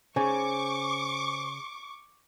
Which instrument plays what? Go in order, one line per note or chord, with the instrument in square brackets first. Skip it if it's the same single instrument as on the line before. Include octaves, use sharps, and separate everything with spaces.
[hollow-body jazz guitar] C#3 [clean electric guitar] C5 G#5 [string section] C#6 D6